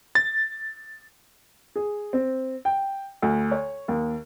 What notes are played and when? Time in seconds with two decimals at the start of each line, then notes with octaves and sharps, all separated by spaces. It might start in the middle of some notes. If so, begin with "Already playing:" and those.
0.15 A6
1.76 G#4
2.13 C4
2.65 G5
3.22 D2
3.51 C#5
3.88 D#2